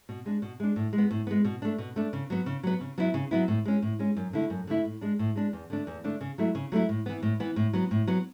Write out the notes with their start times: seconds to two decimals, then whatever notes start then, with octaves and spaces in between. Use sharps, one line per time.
0.09 B2
0.26 G#3 D4
0.42 B2
0.60 G#3 D4
0.76 A2
0.93 G#3
0.98 B3
1.11 A2
1.27 G#3 B3
1.45 B2
1.62 A3 D4
1.78 B2
1.96 A3 D4
2.13 C#3
2.30 F#3 B3
2.46 C#3
2.63 F#3 B3
2.81 C#3
2.98 F#3 B3 E4
3.14 C#3
3.31 F#3 B3 E4
3.48 A2
3.65 G#3 C#4
3.82 A2
3.99 G#3 C#4
4.16 F#2
4.33 D3 A3 E4
4.50 F#2
4.67 D3 A3 E4
4.85 A2
5.01 G#3 D4
5.19 A2
5.36 G#3 D4
5.53 E2
5.70 D3 A3 D4
5.87 E2
6.04 D3 A3 D4
6.21 C#3
6.38 F#3 A3 E4
6.55 C#3
6.72 F#3 A3 E4
6.89 A2
7.06 E3 B3
7.22 A2
7.40 E3 B3
7.56 A2
7.73 F#3 B3
7.91 A2
8.07 F#3 B3